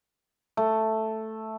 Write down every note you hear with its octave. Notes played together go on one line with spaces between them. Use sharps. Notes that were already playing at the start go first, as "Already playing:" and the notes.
A3